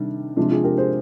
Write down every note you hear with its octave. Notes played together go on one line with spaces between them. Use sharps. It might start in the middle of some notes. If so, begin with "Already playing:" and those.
Already playing: C3 D#3 G3 D4
C3 F3 G#3 D4
F4 G#4
G4 A#4
G#4 C5